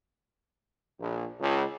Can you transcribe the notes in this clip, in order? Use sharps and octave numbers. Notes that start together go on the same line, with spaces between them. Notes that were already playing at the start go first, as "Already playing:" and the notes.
A#1
C#2